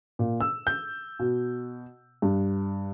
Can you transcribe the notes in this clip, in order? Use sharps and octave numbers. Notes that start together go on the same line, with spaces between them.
A#2
E6
G6
B2
G2